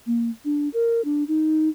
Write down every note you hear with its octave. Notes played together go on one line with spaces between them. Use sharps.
A#3
D4
A#4
D4
D#4